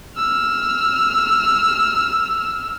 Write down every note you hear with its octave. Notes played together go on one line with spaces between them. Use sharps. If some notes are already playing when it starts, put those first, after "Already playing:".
E6 F6